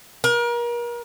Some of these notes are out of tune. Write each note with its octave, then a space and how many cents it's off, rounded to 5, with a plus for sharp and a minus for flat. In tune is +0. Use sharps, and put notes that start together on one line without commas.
A#4 +35